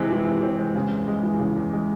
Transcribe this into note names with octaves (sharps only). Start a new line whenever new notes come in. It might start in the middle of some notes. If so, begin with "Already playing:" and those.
Already playing: C3 E3 G#3 C4
E3
C3
C4
G#3
C#3
E2
G#3
E3
C#3
E2
G#3